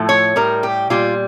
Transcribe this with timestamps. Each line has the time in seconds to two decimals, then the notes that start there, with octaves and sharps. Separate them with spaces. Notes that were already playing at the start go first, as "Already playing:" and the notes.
Already playing: A2 F3 A3
0.09 C#5
0.36 A2 G3 A#4
0.63 G4
0.90 A#2 G3 F4